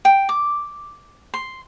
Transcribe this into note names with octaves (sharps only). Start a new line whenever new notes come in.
G5
D6
C6